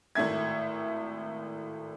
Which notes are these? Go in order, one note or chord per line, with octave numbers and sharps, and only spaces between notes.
G#1 A2 A3 E5 G#6